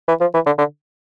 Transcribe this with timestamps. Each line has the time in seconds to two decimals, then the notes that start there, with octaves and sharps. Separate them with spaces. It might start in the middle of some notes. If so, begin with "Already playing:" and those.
0.08 E3
0.21 F3
0.34 E3
0.46 D3
0.58 D3